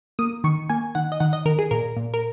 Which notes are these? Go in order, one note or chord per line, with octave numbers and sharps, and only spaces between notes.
A#3 D#6
D#3 C#6
A#3 G#5
D#3 F#5
D#5
D#3 F#5
D#5
D#3 A#4
G#4
A#2 A#4
A#2
A#4